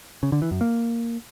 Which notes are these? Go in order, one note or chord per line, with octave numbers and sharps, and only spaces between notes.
C#3
D3
E3
F#2
A#3